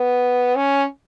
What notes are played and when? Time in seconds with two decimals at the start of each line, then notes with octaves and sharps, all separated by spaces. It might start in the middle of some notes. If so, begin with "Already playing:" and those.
Already playing: B3
0.56 C#4